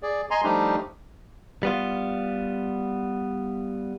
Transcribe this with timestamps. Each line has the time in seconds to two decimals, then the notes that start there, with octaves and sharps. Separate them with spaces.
0.03 G#4 D5
0.31 D#5 G#5 A#5 C6
0.44 F3 G3 A3 D4 D#4 G4
1.63 G3 B3 F4